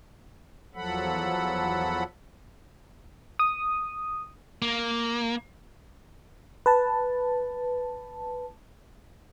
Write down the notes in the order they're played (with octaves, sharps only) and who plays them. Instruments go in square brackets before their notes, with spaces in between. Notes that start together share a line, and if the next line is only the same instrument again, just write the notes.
[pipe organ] E2 F3 F#3 A4 F#5 B5
[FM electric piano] D#6
[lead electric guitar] A#3
[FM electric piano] B4 A5